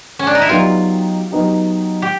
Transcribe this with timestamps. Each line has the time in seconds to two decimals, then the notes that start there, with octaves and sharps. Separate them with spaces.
0.19 C#4
0.27 D4
0.35 D#4
0.42 E4
0.49 F#3 B3 D#4 F4 G4
1.31 F#3 B3 D#4 G4
2.02 G4